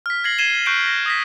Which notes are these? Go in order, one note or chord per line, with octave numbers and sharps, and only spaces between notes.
F6 B6
G#6 A#6 C7 F#7
G#6 C7 D#7 E7 G7
C#6 F#6 G6 C7 D7 E7
A#6
D#6 A#6 B6